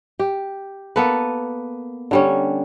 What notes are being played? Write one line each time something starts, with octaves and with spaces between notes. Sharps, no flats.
G4
A#3 B3 A4 B4
D3 G3 C#4